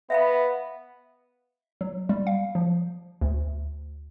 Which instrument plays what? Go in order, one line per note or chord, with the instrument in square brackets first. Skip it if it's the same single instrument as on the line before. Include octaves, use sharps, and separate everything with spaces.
[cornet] B3 [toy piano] E5 F5 B5
[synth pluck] F#3
G3
F5
F3
D2